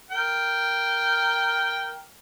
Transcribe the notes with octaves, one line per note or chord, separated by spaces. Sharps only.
A#4 G5